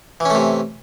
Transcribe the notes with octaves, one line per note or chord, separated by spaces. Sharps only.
C3 E3 A3 C#4